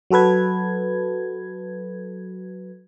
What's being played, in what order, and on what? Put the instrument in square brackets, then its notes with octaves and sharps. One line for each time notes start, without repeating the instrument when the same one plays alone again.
[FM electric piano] F#3 F#4 A4 B4 G#6